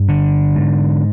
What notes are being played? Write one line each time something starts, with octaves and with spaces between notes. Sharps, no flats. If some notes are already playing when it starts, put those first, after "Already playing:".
Already playing: G2
D3
G#2